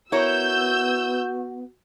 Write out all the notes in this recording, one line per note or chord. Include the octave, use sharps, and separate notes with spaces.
B3 E4 F#4 A#4 C#5 E6 G6